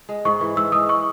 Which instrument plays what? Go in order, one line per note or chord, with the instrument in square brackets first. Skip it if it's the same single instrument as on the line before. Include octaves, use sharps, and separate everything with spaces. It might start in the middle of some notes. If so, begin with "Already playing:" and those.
[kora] G#3
[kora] G#2 [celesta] C#6
[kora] E3
[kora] G#2 [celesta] E6
[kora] G#3 [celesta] D#6
[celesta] C#6